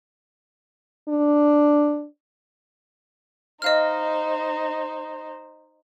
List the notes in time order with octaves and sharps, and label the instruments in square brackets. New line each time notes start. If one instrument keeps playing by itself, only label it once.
[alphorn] D4
[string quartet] D#4 C5 [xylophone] D#5 F5 F6